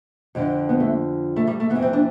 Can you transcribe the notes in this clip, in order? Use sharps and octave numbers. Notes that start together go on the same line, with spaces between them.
F2 D3 F3
B3
A3
A3
G3
A3
E3 B3
F2
C4
D4